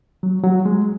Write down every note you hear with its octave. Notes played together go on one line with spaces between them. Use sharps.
F#3
F#3
G#3